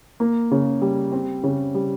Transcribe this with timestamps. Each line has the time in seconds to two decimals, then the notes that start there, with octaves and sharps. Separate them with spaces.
0.20 A#3
0.51 C#3
0.82 G3
1.12 C4
1.44 C#3
1.75 G3